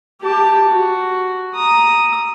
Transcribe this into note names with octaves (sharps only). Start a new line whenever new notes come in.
G4 A5
F#4
A#5 D#6